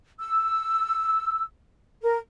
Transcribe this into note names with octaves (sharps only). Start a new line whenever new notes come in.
E6
A#4